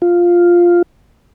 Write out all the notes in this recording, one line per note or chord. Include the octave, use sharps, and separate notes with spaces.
F4